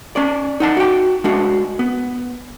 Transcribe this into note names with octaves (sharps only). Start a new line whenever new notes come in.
C#4 D5
D#4 F#5 A5
F#4 G5
G#3 D4 F#4
B3